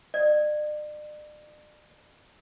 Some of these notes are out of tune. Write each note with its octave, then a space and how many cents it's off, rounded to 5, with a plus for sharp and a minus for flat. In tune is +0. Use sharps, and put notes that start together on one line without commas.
D5 +40